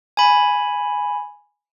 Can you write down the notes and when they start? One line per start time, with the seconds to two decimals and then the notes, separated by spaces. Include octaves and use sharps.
0.17 G#5 B5